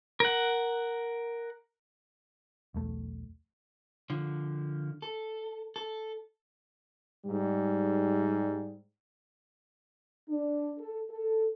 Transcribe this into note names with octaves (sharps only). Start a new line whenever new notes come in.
A#4 F#5
B1 E2 A3
D3 F3
A4
A4
G#2 G3
D4
A4
A4